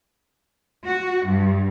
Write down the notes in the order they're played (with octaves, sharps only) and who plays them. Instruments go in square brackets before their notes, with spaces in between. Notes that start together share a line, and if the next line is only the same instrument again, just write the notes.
[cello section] F#4
G2